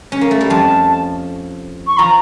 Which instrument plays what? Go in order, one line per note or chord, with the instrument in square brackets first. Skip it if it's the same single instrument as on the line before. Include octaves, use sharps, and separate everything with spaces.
[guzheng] C#4
A#3
A3
G3
[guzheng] F2 F3 [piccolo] A5
[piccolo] C#6
[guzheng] F3 [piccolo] A#5